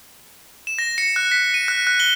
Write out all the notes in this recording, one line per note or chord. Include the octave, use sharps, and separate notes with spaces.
E7
A#6
C#7
F#6
B6
D#7
F#6
F#6
G7